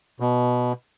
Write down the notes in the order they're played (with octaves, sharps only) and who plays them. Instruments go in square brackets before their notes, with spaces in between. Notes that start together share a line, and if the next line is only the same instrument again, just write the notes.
[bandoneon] B2